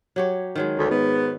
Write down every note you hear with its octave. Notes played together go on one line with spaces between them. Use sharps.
F#3 G4 C#5
D#3 F#3 G#3
D2
G#2 B3